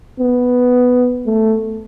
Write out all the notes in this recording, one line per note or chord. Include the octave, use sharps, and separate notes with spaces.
B3
A3